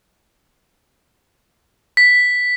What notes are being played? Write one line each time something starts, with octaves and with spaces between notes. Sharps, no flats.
B6